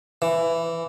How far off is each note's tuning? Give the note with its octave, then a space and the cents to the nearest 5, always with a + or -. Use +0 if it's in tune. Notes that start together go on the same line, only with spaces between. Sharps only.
E3 +10